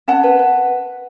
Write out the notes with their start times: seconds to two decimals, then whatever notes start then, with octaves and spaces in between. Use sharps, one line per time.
0.08 C#4 F#5 A5
0.23 B4
0.39 B4